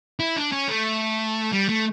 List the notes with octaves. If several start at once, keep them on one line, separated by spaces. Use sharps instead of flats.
E4
D4
C#4
A3
G3
A3